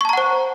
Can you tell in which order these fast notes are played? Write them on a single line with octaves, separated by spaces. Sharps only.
C#6 A5 A#5 F#5 C5